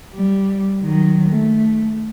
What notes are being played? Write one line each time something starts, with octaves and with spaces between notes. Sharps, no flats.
G3
D#3 F#3
A3